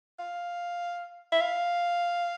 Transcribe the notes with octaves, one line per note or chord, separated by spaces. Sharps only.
F5
E5
F5